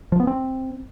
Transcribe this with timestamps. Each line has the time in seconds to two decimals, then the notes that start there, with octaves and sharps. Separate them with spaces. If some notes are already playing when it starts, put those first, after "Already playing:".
0.12 F3
0.20 B3
0.27 C4